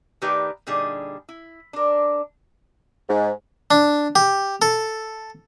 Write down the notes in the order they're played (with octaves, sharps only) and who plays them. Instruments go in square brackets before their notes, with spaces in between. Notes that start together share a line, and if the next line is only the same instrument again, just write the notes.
[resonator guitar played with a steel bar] D#3 A3 D#4 G4 B4 D5
A#2 D3 G3 D#4 G#4
E4
D4 A#4
[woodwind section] G#2
[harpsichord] D4
G4
A4